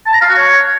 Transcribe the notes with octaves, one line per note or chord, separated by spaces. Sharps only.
A5
A#5
F5
F#4
C#5